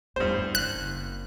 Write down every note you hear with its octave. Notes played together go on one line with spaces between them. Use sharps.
E2 G2 B3 C5
F#1 C4 F#6